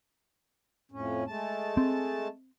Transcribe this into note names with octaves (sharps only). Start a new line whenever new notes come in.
F2 A2 C#4
G#3 A3 A5
C4